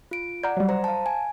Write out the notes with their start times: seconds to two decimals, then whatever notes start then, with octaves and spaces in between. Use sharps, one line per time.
0.11 F4 D7
0.43 D5 F#5 A#5 F6 G6
0.57 F#3 G3
0.69 C5 A#5
0.84 F5 A5
1.06 G#5